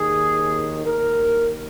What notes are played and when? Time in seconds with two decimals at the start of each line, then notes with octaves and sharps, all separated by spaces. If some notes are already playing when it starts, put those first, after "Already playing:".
Already playing: D#2 D#3 G#4
0.85 D#2 D#3 A#4